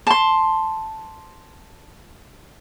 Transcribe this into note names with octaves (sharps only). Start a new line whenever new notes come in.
A5 C6